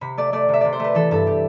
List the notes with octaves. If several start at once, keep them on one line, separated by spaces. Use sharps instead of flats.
C3 B5
A3 D5
A3 D5
C3 E5
C3 D5
C5
A3 B4
E3 A4
G2 A4
G4